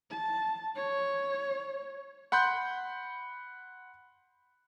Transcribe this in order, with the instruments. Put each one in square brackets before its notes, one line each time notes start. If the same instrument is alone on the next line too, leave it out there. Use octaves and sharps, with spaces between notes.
[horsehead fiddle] A5
C#5
[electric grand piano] F#5 B5 C6 F#6 G6